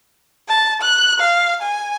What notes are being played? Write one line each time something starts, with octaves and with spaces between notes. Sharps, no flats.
A5
F#6
F5
G#5